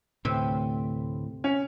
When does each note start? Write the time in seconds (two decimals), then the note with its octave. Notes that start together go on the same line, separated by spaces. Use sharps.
0.25 D2 A2 C3 B4 C5
1.44 C#4